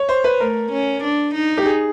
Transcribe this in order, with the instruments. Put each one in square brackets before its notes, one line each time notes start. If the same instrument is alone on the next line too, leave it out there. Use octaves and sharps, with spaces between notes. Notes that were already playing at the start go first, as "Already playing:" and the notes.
Already playing: [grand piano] C#5
C5
B4
[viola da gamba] A3 [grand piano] A#4
[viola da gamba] C#4
D4
D#4
[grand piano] G4
G#4